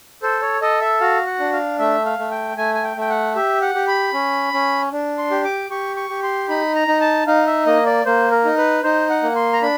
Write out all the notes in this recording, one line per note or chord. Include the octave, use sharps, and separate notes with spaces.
A4 C5
C#5
A4 D#5
E5
F#4 F5
F#5
D4
F5
A3 E5
F5
A3
G5
A3 G#5
G#5
G5
A3 G5
F#5
G4 E5
F#5
G4
B5
C#4
C#4
D4
C6
G4
D6
G4 C#6
C#6
G4
C6
D#4 B5
A#5
D#4
A5
D#4 F5
E5
A#3 D#5
D5
A#3 C5
A#4
D#4
B4
D#4 C5
F#5
A#3
C6
A#5
D4 B5